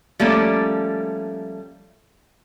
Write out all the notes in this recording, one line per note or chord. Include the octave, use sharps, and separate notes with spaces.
F3 G3 A3 A#3 C#4